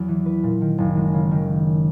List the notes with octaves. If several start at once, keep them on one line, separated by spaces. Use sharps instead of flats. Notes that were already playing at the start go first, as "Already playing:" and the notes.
Already playing: E2 F#3
E3
B4
A#2
D#3
F#1
G#3
C#3
D#3